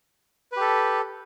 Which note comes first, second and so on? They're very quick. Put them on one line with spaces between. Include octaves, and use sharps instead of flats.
B4 G4 A4